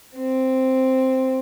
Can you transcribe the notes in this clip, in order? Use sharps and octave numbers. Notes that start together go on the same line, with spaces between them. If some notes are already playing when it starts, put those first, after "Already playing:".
C4